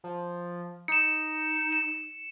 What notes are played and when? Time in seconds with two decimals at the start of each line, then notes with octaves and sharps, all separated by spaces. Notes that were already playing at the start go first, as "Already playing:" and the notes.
0.04 F3
0.88 D#4 C#7 E7
1.73 E7